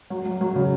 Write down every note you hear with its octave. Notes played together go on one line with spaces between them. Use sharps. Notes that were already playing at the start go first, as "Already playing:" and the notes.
F#3
F#3
F#3
C#3